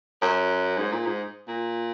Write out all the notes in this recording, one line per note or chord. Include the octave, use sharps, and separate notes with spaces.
F#2
G#2
A#2
G#2
A#2